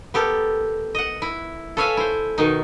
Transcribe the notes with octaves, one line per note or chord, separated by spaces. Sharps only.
B3 G4 A4 A#4
D#5 F#5
E4
A4 B4 C#5 E5 F5 G#5
E4 C5
B2 D#3 D#4